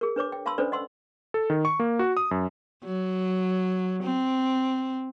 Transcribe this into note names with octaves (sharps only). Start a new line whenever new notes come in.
G#4 A#4
D4 B4 C#5 D6
G5
F5 A5 B5 C6 E6
C#4 D4 A4 B4 C5 D5
D#5 F#5 C6 E6
A4
D#3
C#6
A#3
F#4
D#6
F#2
F#3
C4